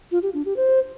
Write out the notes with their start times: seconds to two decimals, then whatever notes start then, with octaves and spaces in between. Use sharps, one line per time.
0.12 F4
0.23 G4
0.34 D4
0.45 G4
0.56 C5